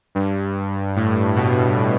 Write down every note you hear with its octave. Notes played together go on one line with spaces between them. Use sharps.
G2
A2
B2